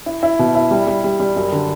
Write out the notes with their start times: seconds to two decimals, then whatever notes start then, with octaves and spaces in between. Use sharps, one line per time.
0.06 E4
0.23 E4
0.39 B2
0.55 E4
0.71 G3
0.87 G3
1.04 G3
1.20 G3
1.36 F#2
1.52 D3